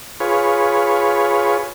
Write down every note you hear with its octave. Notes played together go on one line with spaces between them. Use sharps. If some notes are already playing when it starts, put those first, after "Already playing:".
F4 G#4 B4 C#5